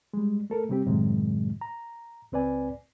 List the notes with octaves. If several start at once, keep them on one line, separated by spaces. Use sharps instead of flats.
G3 G#3
A3 A4 A#4
C3 G3 C4 G4
F#2 A2 C3 D#3 F#3 G#3
A#5
C#2 C4 B4 D5 G#5